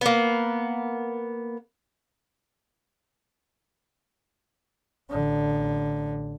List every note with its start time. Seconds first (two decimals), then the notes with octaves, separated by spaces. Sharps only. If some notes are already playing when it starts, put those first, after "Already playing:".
0.01 A#3 B3
5.10 A1 D3